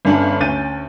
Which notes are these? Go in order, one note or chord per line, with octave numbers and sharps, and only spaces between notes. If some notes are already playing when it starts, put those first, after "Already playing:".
G1 G2 C#4 D4 B5
D2 C#4 G6 A6 D#7